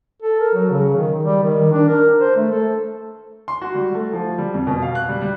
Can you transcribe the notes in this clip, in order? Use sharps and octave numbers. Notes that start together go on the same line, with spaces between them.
A4
A#4
F#3
C#3
D#3
G3
D#3
D4
A#4
C5
A3
A4
C6
F#4
G3
A3
F3
G3
F2
B2
F5
F#6
G3
G3